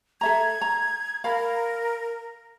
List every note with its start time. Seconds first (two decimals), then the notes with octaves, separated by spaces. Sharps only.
0.21 A4 E5 A#5 G#6
0.61 A#5
1.24 A#4 F5 B5